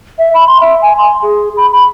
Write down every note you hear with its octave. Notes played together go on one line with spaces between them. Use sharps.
E5
B5
C6
E5
G#5
C6
G#4
B5
B5